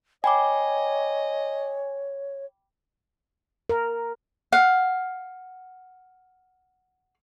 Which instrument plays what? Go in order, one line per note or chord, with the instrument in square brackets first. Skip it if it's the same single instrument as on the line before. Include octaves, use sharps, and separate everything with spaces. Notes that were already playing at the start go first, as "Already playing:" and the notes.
[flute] C#5 [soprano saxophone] D#5 [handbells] G5 B5 D6 [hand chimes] G#5
[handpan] A#4
[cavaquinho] F5 F#5